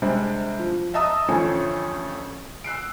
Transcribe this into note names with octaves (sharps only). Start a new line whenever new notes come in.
C3 G3 G#3 C4 D4
F3
D#5 E5 A5 A#5 D#6 E6
A1 D3 F3 C#4 A4 G#5
E6 F#6 C7 D7